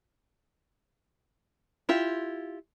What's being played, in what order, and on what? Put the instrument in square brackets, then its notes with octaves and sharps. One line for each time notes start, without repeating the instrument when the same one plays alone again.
[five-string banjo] E4 F4 G4